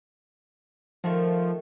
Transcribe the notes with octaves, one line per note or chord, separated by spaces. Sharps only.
D#3 F3 A3